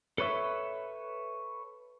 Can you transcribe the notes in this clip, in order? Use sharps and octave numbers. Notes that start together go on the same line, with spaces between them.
A4 B4 C#5 E5